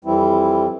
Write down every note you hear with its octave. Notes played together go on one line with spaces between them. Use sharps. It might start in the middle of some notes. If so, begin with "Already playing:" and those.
F2 E3 G3 C4 E4